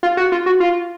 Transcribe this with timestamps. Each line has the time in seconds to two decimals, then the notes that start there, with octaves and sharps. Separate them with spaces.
0.03 F4
0.17 F#4
0.32 F4
0.46 F#4
0.60 F4